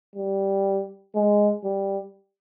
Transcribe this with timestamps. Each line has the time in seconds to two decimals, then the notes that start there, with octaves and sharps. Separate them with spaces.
0.16 G3
1.15 G#3
1.64 G3